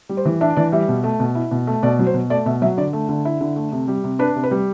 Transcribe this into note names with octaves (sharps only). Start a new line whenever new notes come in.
G3
C5
E3
D4 E5
E3 D5
G3 E5
B2
A3
B2
E4
B2
A3
B2 D5
F#3
C5
B2
A3 D5
B2 E5
F#3 E5
D3 D5
A3
D3
E4
D3
A3
C3
G3
C3
D4 B4
C3
B4
G3